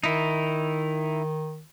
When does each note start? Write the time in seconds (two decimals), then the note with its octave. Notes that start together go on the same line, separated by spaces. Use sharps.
0.04 D#3 D#4 E4